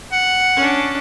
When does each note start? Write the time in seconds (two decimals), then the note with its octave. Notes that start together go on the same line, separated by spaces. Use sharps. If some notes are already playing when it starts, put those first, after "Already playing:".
0.12 F#5
0.56 C#4 D4